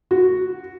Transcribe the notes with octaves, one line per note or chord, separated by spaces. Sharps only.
F#4